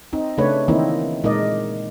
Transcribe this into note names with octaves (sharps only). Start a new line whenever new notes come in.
C4 D#4
C#3 A3 D4 B4 C#5
D#3 E3 A#3 C4 D#4 E4
A#2 G#3 D#4 A#4 D5 D#5